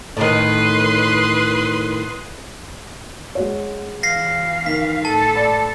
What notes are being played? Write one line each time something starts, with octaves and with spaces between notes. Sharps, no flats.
A2 D#3 B4 C6 D#6
G#3 F#4 C#5
E3 F5 A#6 C7
D#3 B6
A2 A4 A5
D5 B5